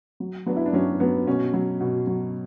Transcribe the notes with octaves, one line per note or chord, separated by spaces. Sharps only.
F#3
F#3 B3 D4
E4
D4
F#3 C#4
F#3 B3
B2 C#4
F#3
B2
F#3